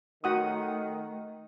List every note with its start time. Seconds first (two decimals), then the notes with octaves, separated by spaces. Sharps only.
0.24 D#3 A3 F#4 F#5 D#6